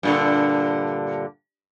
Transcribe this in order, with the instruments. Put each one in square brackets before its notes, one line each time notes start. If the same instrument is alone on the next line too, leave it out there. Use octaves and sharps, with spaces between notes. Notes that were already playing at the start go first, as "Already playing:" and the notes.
[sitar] G2 A#2 D3